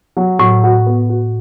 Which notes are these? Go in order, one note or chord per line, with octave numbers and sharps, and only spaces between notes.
F#3
A2 F#3
F#4
B3
F#4